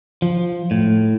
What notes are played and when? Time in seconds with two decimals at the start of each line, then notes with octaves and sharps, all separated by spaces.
0.22 F3
0.71 A2